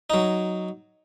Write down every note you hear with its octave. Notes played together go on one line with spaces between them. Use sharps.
F#3 D#4